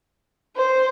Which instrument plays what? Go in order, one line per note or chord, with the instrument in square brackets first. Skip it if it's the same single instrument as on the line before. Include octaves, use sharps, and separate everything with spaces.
[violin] C5